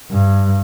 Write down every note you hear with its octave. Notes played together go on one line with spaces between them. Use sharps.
G2